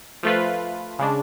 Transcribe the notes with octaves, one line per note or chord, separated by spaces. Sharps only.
F3 A3 F4 B4
C#3 G#3 D4